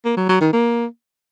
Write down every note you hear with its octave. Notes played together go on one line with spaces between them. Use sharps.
A#3
F#3
F#3
D#3
A#3